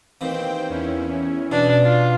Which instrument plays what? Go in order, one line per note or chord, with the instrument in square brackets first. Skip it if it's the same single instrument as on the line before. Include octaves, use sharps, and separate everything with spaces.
[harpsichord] D#2 E3 [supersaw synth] C4 C5 G5
[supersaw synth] E2 C#4 E4
[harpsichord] B2 [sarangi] D4
[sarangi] F4